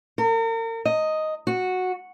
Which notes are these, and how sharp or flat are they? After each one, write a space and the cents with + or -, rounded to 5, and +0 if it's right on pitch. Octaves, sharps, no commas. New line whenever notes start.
A#4 -40
D#5 +5
F#4 -10